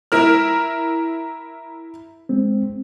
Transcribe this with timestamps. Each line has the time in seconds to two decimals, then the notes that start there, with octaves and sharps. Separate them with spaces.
0.12 E4 A#4 F6
2.29 G#3 C4